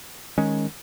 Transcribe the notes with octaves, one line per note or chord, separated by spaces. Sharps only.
D#3 G#3 C#4